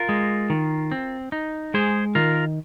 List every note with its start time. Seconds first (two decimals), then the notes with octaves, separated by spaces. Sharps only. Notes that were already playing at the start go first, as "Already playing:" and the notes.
Already playing: F4 A#4
0.09 G#3
0.50 D#3
0.92 C4
1.32 D#4
1.74 G#3 G#4 C5
2.15 D#3 F4 A#4